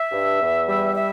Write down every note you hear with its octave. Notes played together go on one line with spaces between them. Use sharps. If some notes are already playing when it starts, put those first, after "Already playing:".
Already playing: E5
G2
E2
G3
E5